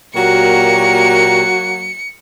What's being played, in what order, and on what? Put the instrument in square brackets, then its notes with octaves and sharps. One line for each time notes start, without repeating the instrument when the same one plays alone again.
[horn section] A#2 G4 A#4 [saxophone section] F#3 A#3 F#4 [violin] C#7